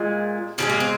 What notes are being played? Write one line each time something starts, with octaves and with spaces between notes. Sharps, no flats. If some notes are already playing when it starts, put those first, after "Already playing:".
Already playing: A#2 G#3
C#3 F3 G#3 C4
A#3
C4